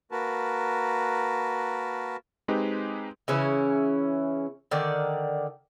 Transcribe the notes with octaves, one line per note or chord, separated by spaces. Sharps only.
A#3 F#4 A#4 B4 A5
G#3 C4 D#4 G4 G#4 B4
C#3 E3 C#4 E4
D3 D#3 D5